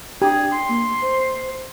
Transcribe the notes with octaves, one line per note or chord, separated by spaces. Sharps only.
D4 G4 G#4
C6
A#3
C5